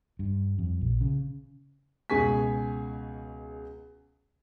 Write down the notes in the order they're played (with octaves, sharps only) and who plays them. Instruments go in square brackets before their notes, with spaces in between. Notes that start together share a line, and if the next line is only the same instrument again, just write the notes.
[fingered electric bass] G2
F2
A#1
C#3
[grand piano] C#2 B2 G#4 G#5 C#6 B6